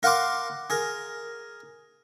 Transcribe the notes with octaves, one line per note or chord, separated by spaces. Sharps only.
A#4 F5 F#5 C6 D6
G#4 A#4